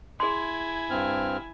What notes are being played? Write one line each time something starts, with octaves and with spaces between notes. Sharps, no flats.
E4 G#4 G#5 C6
G2 C4 F6